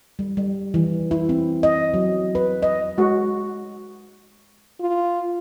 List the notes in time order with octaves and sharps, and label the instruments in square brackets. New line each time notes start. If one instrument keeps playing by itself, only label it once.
[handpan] G3
G3
E3
E4
C4
D#5
F#3
B4
D#5
[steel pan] G#3 F#4
[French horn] F4